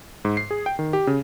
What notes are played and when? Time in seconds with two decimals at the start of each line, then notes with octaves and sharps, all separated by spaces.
0.25 G#2
0.37 C7
0.51 G#4
0.66 G5
0.79 D#3
0.93 G4
1.07 C#3